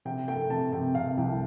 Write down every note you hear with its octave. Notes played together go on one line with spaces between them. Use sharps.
C3 G5
A3 G5
C3 A5
C3 G5
C3 F5
C2 G5